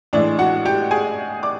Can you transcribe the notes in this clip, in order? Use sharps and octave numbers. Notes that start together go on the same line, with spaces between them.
A2 E3 G#3 D4 D5
F#4 F#5
G4 G5
G#4 G#5
D5 D6